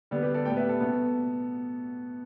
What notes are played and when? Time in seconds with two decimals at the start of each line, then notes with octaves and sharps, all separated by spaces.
0.11 D3 G3 B3
0.23 G4 B4
0.34 A4 D5
0.45 A2 G3 B3 D5 G5
0.57 B4 E5
0.69 A4
0.80 B2 B3